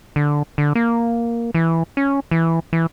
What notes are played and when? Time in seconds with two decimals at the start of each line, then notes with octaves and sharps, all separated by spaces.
0.16 D3
0.58 D3
0.75 A#3
1.55 E3
1.97 C#4
2.31 E3
2.73 E3